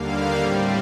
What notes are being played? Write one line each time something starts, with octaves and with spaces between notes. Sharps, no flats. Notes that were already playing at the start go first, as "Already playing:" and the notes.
Already playing: D#2 D3 G3 A#3 F5
A2 G3 C4